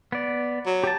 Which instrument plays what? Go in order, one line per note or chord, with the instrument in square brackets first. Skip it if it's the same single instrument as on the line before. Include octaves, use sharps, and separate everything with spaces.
[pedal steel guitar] B3 D5
[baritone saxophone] F#3
[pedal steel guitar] G4 A5